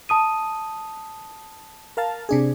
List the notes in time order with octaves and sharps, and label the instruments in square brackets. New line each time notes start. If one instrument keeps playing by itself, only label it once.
[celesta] A5 D#6 D#7
[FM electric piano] A#4 F5 A5
C3 D4 G#4